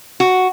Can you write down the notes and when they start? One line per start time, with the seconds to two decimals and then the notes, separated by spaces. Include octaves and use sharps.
0.20 F#4